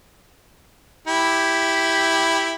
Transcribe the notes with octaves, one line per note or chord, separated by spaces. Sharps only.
E4 G4